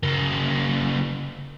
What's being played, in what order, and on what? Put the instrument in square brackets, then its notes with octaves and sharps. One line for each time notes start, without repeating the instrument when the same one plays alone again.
[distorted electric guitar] C#3 A#3